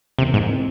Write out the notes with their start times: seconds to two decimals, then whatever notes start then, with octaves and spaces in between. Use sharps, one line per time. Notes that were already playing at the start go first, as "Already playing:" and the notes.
0.19 E1 C3
0.34 G#2
0.49 E3 G#3 C4